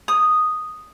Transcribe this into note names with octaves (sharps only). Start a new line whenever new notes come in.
D#6